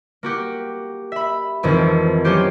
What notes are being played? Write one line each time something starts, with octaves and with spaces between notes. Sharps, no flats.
A#3 F#4 G4
E5 B5
G#1 F2 D#3 E3
F#3 A#3 C#4 F4 G4 C5